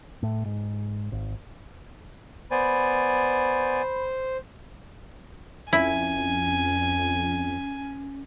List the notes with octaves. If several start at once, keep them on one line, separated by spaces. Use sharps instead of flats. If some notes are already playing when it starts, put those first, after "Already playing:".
A2
G#2
G#1
B3 C5 D5 G#5 B5
F2 C#4 E4 G#5